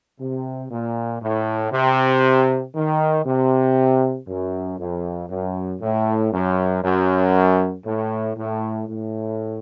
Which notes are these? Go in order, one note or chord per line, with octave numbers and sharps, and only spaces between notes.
C3
A#2
A2
C3
D#3
C3
F#2
F2
F#2
A2
F#2
F#2
A2
A2
A2